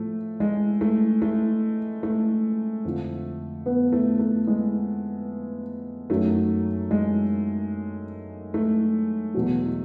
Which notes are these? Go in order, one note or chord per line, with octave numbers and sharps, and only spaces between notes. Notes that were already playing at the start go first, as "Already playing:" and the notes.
Already playing: A2 F3 A3
G#3
A3
A3
A3
F2 D3 F3
B3
A3
A3
G#3
F#2 D#3 F#3 A3
G#3
A3
E2 B2 F#3